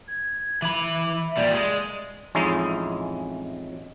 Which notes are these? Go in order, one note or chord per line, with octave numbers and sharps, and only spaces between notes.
G#6
E3 B5 D6
E5
A#2 G3 D5
G#3
A1 F2 G#3 C#4 D#4 E4